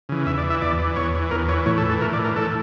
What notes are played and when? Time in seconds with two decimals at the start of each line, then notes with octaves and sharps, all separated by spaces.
0.09 C#3 E3
0.26 E2 E5
0.38 D5
0.44 E3
0.50 E5
0.62 E2 D5
0.79 E3
0.96 E2 C#5
1.14 E3
1.31 E2 A#4
1.48 E3 C#5
1.66 A2 C#5
1.78 A4
1.84 E3
1.90 A4
2.01 A2 A#4
2.13 D5
2.19 E3
2.24 A#4
2.36 A2 A4